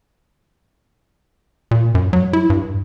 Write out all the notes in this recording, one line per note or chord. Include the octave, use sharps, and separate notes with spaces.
A#2
F#2
F#3
E4
G2